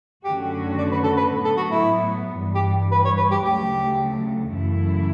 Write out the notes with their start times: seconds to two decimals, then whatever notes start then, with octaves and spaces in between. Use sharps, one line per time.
0.24 F#2 D3 A3 C#4 F#4 G4
0.78 D5
0.92 B4
1.04 A4
1.17 B4
1.31 A2 F#3 B3
1.45 A4
1.57 F#4
1.71 E4
2.38 G2 E3 G3
2.55 G4
2.92 B4
3.05 C#5
3.17 B4
3.31 G4
3.44 D2 C#3 F#3 A3 G4
4.51 F#2 C#3 E3 A3 E4